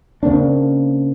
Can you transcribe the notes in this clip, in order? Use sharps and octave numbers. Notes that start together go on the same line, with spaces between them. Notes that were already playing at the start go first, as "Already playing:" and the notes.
C#3 A#3 C4 D4